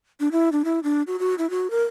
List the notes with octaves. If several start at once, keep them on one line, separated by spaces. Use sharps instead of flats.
D4
E4
D4
E4
D4
F#4
F#4
E4
F#4
A#4